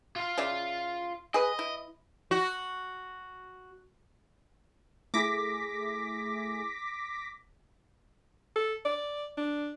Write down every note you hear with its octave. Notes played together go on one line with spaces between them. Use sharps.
F4 F5
C#3 D5 E5
G#4 B4 D#5
E4
F#4
A3 E4 G#4 D6 A#6 B6
A4
D5
D4